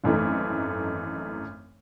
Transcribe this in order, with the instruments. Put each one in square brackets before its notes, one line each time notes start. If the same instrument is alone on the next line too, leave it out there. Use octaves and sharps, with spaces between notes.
[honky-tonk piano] G#1 F#2 E3 A3 D#4